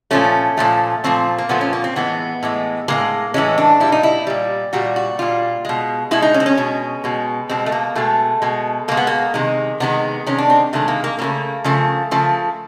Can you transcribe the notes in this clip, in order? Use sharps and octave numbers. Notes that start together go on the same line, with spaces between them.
A#2 F3 A3 C#4
A#2 F3 A3
A#2 F3 A3 C4
A#3
A#2 F3 A3 B3
C#4
A#3
C4
A2 E3 G#3 B3
A2 E3 G#3
A2 E3 G#3 A#3
A2 E3 G#3 C#4
D4
A#2 G3 E4
D#4
E4
A#2 G3
A#2 G3 F#4
F#4
A#2 G3 F4
B2 G#3
B2 G#3 E4
D#4
C#4
C4
C#4
B2 G#3
B2 G#3
B2 G#3 C4
A3
A#3
B2 G#3 A3
B2 G#3
B2 G#3 A#3
B3
A#3
C3 D#3 G#3
C3 D#3 G#3 B3
C3 D#3 G#3 C#4
D4
C4
C3 D#3 G#3 A3
A#3
A#3
C#3 F3 A3 A#3
C#3 F3 A3
C#3 F3 A3